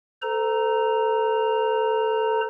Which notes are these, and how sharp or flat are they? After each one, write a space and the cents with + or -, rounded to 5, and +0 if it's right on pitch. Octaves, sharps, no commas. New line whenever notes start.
A4 +0 C5 -40 A#5 +0